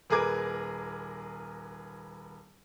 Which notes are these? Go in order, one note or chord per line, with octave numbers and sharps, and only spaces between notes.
D#1 G#4 A#4 B4 D6 G#6